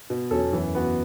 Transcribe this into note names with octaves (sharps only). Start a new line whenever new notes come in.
B2
E2 F#3 C#4 A4
F#2 E3
B3 F#4